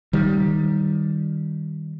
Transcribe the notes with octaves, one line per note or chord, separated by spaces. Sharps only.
D#3 G3